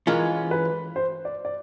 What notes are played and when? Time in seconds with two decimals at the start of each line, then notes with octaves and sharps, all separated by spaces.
0.07 E3 G#3 C#4 F4 A#4
0.51 B4
0.96 C5
1.25 D5
1.45 D5